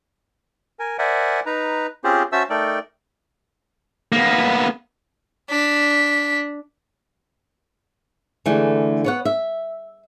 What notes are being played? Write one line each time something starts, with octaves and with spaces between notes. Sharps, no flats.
A#4 G#5
A#4 C5 D5 E5 F#5 G#5
D#4 B4 A#5
C4 C#4 F4 G4 G#4 C5
C#4 F#4 C5 E5 A5 E6
A3 D#4 A4 A#4 D5 G5
A#3 B3
D4 B6
D3 E3 G#3 A3
B3 C#5 F#5
E5